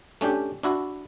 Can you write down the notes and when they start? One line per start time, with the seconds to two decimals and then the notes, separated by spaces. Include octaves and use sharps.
0.21 A3 C#4 D4 G4
0.63 D4 E4 F#4